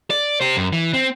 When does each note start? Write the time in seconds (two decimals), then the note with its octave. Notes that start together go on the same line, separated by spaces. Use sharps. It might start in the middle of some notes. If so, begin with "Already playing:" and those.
0.10 D5
0.41 G4 C5
0.56 F#2
0.73 E3
0.93 C4